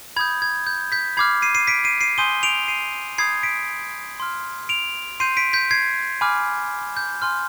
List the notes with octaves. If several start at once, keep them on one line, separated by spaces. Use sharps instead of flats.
B5 D#6 G6 G#6
G#6
G6
G6 B6
B5 D6 F6 G#6 C7
C7 D#7
C7 D#7
B6 D7
C7 D#7
C7 D#7
G#5 C6 D#6 G6 D#7 G7
D7 F7
C7 D#7
B5 D#6 G6 G#6 C7
B6 D7
C6 F6
D7 F7
C6 G6 C7 D#7
B6 D7
G6 B6
G#6 C7
G#5 B5 D6 F6
G6
G#5 C6 F6